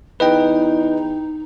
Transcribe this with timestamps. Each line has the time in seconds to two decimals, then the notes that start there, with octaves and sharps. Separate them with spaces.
0.20 E2 D#4 B4 D#5 G5